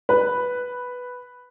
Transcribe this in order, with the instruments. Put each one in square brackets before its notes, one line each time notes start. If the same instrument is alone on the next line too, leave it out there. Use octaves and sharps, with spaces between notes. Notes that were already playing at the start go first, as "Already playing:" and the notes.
[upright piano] B4